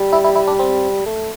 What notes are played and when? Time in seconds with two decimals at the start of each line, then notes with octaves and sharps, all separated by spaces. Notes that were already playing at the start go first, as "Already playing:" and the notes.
Already playing: G3
0.13 E4
0.24 E4
0.36 E4
0.48 D4
0.59 C4
1.06 A3